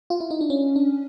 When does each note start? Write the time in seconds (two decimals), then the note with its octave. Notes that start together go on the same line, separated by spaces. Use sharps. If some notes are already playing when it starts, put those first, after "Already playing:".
0.10 F4
0.20 E4
0.31 D#4
0.41 D4
0.50 C#4
0.76 D4